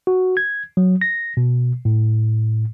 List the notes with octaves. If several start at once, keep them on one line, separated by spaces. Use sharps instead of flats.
F#4
G#6
F#3
A#6
B2
A2